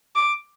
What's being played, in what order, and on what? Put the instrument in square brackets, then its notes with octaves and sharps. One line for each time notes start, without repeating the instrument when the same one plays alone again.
[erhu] D6